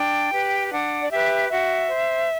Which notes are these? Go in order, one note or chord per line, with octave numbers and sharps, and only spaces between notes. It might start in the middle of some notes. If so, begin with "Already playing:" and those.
Already playing: D4 G5
G4 B4
D4 F#5
D5
G4 B4 E5
F#4 E5
C5